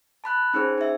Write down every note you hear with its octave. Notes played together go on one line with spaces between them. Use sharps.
A5 B5 F#6
C#4 D#4 G#4 C5
D#4 E5